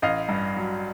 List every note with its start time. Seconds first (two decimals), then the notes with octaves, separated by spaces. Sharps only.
0.02 A1 D#5 F5
0.29 G2
0.56 F#3